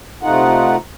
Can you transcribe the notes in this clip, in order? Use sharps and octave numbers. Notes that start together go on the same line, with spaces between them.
C3 A3 D#4 F4 F#5